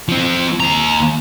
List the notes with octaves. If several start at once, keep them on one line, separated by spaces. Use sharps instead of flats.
F3 C4
D#2 A#5